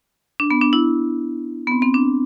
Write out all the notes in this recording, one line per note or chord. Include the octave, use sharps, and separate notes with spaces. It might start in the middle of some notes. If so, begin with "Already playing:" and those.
D4
B3
D4
E4
B3
C4
C4
D4